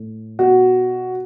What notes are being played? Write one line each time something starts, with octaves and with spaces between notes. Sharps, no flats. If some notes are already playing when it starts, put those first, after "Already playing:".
Already playing: A2
B2 F#4